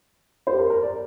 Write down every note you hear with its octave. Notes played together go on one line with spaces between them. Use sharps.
C5
G4
A#4
A#4
D5